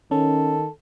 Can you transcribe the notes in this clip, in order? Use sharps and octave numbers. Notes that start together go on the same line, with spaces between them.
D#3 C#4 A4